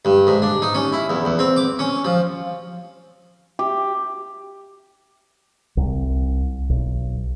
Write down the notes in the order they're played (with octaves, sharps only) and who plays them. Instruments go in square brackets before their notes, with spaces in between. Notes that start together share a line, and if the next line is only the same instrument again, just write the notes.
[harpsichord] G2
G#2
D4
D#4
C#4
E4
E2
E2
C4
D6
C#4
F3
[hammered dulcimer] G4
[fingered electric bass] C2
B1